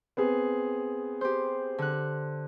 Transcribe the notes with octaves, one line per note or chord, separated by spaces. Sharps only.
B3 C4 G#4
G4 C5
D3 F#6